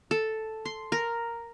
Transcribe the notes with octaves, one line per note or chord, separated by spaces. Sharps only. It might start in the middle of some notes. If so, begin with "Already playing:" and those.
A4
C6
A#4